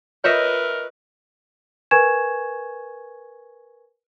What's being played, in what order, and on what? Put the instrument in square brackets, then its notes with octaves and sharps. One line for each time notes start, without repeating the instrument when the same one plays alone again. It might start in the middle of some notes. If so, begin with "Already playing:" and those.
[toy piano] F4 C#5 [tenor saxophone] A#4 [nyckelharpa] B4 [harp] D#5 E5 C#6
[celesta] A#4 B4 G#5 C#6 G#6 E7